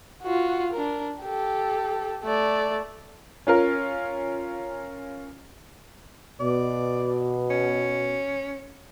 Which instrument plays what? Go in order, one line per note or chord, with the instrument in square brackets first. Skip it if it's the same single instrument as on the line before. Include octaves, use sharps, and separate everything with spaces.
[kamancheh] F4 F#4
D4 A#4
G4 A4
A3 D5
[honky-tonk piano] C#4 F4 A#4
[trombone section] B2 [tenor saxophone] D5
[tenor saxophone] C#4